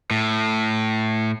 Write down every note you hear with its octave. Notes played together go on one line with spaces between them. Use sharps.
A2